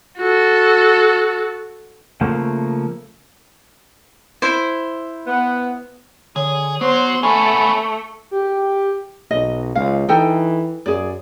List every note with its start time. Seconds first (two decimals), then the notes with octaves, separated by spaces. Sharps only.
0.18 F#4 A4
2.21 C#3 F3 A3 A#3
4.42 E4 C5
5.27 B3
6.36 D3 G#4 C#5
6.81 F#3 B3 C5 C6
7.23 A3 B3 C#4 G#5 B5
8.31 G4
9.31 B1 D#5
9.75 C#2 F5
10.09 E3 D#4 A4 G5
10.86 F#2 G#4 D5